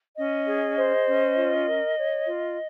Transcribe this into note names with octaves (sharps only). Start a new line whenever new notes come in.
C#4 D#5
G#4
C5
C#4
F4
A#4
C#5
F4